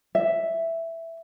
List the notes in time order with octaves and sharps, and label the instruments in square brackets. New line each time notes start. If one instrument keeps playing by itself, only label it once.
[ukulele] E5